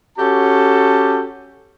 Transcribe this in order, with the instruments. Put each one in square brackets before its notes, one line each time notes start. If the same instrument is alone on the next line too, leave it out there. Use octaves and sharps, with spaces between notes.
[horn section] C#4 F#4 G4 A4 A5